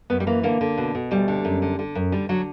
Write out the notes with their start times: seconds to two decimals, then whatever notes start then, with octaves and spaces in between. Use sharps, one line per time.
0.10 F#2 B3
0.20 G3
0.27 E3 A#3
0.43 D3 A#3
0.61 D3
0.78 B2
0.95 B2
1.11 D2 G3
1.28 D3
1.45 F#2
1.62 D3
1.79 D3
1.95 F#2
2.12 D3 G3
2.29 D3 F#3